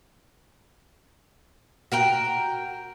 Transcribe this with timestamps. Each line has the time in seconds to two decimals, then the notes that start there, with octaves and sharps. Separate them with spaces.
1.92 F#4 A#4 G5